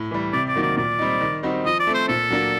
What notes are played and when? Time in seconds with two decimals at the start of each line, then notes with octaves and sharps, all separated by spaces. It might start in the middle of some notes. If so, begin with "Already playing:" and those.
Already playing: A2
0.11 E3 G3
0.33 C3 D5
0.48 D5
0.55 D#3 F#3 A#3
0.62 D5
0.77 A#2 D5
0.99 G3 C4 D#4
1.21 D#3
1.43 G3 C4 D#4 F#4
1.65 F3 D#5
1.79 D5
1.87 A3 C4
1.94 C5
2.08 A#2 A4
2.30 F#3 A#3 D4